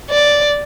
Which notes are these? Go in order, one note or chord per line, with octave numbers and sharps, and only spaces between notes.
D5